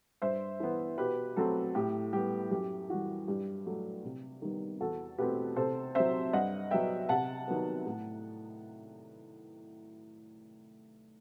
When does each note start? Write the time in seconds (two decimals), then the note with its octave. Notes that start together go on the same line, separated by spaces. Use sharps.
0.22 G2 C5 E5
0.60 E3 B3
0.98 B2 G4 B4
1.36 F#3 A3 C4 F#4 A4
1.75 A2 G4
2.13 G3 B3 G4
2.51 F#2 G4
2.90 E3 G3 F#4
3.28 G2 G4
3.66 F#3 A3
4.04 C3
4.42 D#3 G3 B3
4.80 E2 F#4 A4
5.18 B2 A3 C4 G4 B4
5.56 C3 A4 C5
5.95 F#3 C4 C5 E5
6.33 G2 D#5 F#5
6.71 F#3 B3 E5 G5
7.09 C3 F#5 A5
7.48 D#3 F#3 B3
7.86 A2